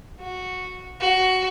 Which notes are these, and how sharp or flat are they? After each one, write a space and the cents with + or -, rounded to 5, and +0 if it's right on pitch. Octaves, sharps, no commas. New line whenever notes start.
F#4 -10
F#4 +10